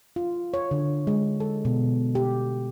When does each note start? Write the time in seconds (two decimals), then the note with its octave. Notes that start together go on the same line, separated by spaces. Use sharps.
0.16 F4
0.54 C#5
0.71 D3
1.07 G#3
1.40 A4
1.65 B2
2.15 G4